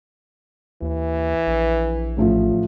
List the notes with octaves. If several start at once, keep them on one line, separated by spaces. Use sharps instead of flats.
D#2 E3
A#1
A1 A2 F3